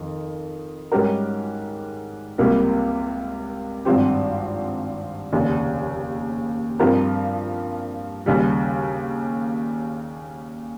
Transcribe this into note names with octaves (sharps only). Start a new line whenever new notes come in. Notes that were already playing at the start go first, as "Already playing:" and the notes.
Already playing: F2 D#3
G#2 G3 C#4 G4 A#4
C#2 C3 G3 A#3
G#1 G2 F3 C4 G4
F1 D#2 C#3
G2 F3 C4 G4 A#4
D#2 C#3 G3